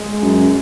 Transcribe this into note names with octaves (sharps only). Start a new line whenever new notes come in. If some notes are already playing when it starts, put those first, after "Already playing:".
Already playing: G#3
F#2